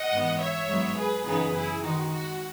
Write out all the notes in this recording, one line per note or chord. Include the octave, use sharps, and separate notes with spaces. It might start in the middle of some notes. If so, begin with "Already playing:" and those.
Already playing: D#5 F#5
G#2 E3 B3
C#5 E5
G#2 F#3 B3
G#4 B4
F#2 C#3 E3 B3 D#4 G#4 B4
E4 G#4
D#3 G#3 D#4 F#4
F#4